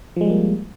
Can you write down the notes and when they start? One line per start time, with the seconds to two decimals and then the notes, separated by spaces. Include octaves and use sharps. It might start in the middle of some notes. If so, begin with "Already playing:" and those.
0.16 F3
0.21 G#3
0.26 G3
0.30 A#3